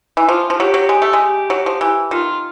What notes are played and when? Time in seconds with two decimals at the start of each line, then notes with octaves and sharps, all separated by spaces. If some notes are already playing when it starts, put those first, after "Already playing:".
0.17 E3
0.28 F3 F4
0.50 F3
0.59 F#3 G4
0.74 F#3
0.89 G#3
1.02 A3
1.13 G#3
1.21 G4
1.50 F#3
1.66 F3
1.81 E3
2.11 D#3 F4